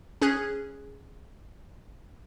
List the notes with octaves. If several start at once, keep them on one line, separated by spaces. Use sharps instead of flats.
C#4 G#4 F#6 G#6